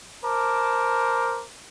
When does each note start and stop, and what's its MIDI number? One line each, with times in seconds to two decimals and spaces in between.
0.24 1.44 70
0.24 1.44 72
0.24 1.44 81
0.24 1.44 86